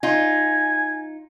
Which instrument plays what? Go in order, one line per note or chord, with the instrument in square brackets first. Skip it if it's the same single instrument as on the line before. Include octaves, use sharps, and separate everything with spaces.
[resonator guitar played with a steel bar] D#4 F4 [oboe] G#5